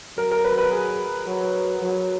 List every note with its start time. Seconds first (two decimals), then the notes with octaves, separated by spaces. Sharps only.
0.17 F#3 A#4
0.31 A#4
0.44 B4
0.58 B4
0.71 G#4
1.27 F#3
1.82 F#3